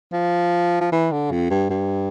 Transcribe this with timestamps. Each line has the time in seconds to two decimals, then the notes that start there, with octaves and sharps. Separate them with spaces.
0.13 F3
0.81 F3
0.92 E3
1.12 D3
1.32 F2
1.50 G2
1.70 G2